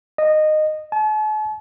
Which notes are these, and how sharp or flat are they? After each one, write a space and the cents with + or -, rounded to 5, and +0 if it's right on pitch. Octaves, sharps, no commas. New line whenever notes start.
D#5 -15
A5 -45